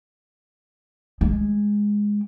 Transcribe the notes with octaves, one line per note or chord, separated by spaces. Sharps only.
G#3